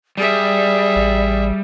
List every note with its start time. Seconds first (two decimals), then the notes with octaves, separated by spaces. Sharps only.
0.17 G3 G#4 D5 E5
0.96 A1